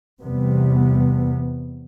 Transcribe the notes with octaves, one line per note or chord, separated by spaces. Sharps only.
E2 C3 G3 B3